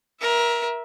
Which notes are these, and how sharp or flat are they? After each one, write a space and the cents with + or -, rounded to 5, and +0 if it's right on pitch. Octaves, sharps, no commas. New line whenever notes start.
A#4 +20 E5 +0